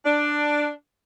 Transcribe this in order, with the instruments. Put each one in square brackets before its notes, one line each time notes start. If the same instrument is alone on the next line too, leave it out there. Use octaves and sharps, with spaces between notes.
[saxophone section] D4